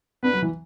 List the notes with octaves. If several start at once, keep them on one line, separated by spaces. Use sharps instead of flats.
B3 D4 B4
F#3
E3